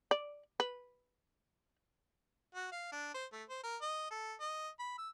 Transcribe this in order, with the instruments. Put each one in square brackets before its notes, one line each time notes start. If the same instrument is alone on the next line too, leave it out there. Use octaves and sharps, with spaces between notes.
[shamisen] D5
B4
[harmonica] F#4
F5
D4
C5
A3
C5
A#4
D#5
A4
D#5
B5
E6